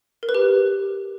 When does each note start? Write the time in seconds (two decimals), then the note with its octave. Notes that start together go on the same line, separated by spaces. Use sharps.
0.23 A#4
0.29 B4
0.35 G4